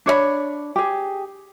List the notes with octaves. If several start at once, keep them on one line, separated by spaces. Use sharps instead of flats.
D4 C#5 D#5 B5
G4 G#4